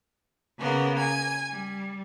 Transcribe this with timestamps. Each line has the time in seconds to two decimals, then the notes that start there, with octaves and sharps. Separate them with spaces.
0.59 C#3 A#3 B3
1.00 G#5
1.51 G3